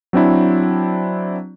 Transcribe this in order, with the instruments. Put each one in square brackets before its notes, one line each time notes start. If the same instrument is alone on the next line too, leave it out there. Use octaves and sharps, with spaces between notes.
[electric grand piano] F#3 C4 D4 E4